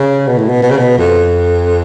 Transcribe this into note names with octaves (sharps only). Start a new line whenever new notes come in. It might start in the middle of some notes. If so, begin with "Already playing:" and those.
Already playing: C#3
B2
A2
B2
B2
C#3
B2
F2